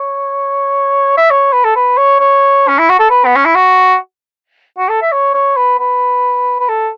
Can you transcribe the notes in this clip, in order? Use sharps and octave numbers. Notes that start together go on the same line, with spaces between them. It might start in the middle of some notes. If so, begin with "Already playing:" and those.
Already playing: C#5
E5
C#5
B4
A4
B4
C#5
C#5
C#4
E4
F#4
A4
B4
B3
C#4
E4
F#4
F#4
A4
E5
C#5
C#5
B4
B4
B4
A4